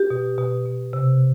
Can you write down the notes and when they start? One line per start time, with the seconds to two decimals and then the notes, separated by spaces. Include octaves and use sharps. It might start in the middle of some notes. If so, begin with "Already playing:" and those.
Already playing: G4
0.10 B2
0.38 B2
0.66 B2
0.93 C3